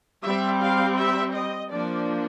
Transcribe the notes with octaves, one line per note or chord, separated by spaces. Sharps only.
G3 C4 E5
F5
E5
D#5
F3 A#3 D4 D5